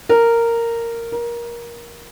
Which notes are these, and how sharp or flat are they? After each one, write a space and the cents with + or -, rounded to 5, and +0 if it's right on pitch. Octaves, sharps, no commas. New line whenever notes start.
A#4 -10
A#4 +20